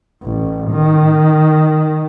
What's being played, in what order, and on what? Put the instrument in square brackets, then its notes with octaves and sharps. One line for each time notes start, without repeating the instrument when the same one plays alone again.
[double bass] A1
D#3